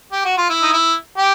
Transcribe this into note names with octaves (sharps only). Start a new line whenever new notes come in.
G4
F#4
F4
E4
D#4
E4
G4